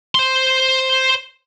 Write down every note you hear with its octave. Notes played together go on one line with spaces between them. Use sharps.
C5 C6